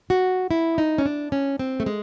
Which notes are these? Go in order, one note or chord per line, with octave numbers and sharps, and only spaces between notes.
F#4
E4
D#4
C#4
D4
C#4
C4
A3
G#3